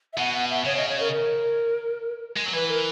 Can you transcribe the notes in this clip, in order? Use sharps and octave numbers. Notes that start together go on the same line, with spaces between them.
E5
B2 F#5
F#5
E5
C#3 C#5
D#5
C#5
A#4
A#4
G#3
F#3
E3 B4
A#4